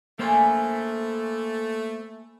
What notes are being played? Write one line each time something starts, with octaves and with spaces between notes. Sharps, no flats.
A3 A#3 C5 G#5 B5